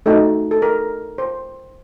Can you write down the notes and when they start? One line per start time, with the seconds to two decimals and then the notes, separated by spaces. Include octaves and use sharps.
0.06 A3 D#4 F#4 A4
0.51 A4
0.62 A#4
1.18 C5